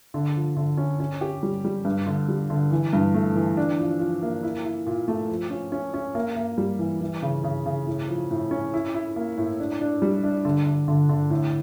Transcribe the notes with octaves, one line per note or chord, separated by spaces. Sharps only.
D3
F3
D3
C#4
C#4
G4
G3
G3
G2
D3
G3
D3
E3
G2
A3
E3
D4
F3
F3
A#3
E4
E4
A#2
A3
F3
C#4
C#4
C#4
A#3
A#3
G3
E3
E3
C#3
C#3
C#3
A2
F3
A2
C#4
E4
E4
A#3
A2
D4
D4
G3
D4
D3
D3
D3
D3
A2